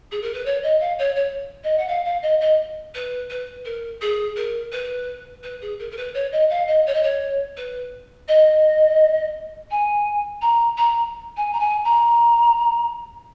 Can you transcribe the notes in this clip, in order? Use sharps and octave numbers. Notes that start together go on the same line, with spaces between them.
G#4
A#4
B4
C#5
D#5
F5
C#5
C#5
D#5
F#5
F5
F5
D#5
D#5
B4
B4
A#4
G#4
A#4
B4
B4
G#4
A#4
A#4
B4
C#5
D#5
F5
D#5
C#5
D#5
C#5
B4
D#5
G#5
A#5
A#5
G#5
A#5
G#5
A#5